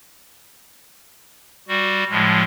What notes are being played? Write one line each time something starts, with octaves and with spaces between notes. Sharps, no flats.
G3 F#4
A2 F3 G#3